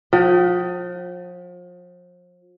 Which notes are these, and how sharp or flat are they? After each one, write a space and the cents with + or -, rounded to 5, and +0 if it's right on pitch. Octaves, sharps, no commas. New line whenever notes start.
F3 +35 G5 -30